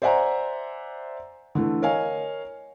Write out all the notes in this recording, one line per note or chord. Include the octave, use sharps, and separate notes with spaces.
C5 D5 E5 F#5 G#5 A#5
D3 E3 A3
A#4 C#5 D#5 F5 G#5